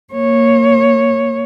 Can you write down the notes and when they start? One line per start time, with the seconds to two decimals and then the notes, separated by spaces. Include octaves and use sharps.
0.14 A#3 C#5